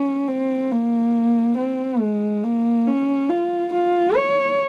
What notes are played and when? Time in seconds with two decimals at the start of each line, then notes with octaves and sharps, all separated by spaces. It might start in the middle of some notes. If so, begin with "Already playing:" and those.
Already playing: C#4
0.28 C4
0.71 A#3
1.57 C4
2.01 G#3
2.43 A#3
2.87 C#4
3.29 F4
3.73 F4
4.16 C#5